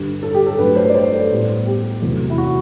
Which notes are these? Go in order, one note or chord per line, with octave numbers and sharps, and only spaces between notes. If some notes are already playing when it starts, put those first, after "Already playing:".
Already playing: G2 D3 G3
A4
G4
A4
G2 F#3 A3 B4
C5
D5
C5
A4
A2 G3 B3
G4
E2 C3 F#3 A3
E4
F#4